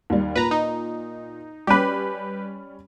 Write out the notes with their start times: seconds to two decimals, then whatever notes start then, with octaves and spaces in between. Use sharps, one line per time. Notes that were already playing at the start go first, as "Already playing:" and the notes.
0.10 D#2 G3
0.36 A#2 B4 A#5
0.51 D#4
1.67 G3 C#4 G4 B4 B5